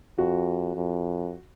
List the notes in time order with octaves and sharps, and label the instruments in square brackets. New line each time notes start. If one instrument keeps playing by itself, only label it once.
[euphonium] F2 [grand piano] F#4
[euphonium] F2